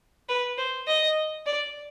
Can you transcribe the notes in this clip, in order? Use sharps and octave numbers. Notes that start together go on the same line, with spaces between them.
B4
C5
D#5
D5